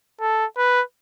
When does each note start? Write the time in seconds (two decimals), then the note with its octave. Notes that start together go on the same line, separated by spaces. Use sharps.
0.21 A4
0.57 B4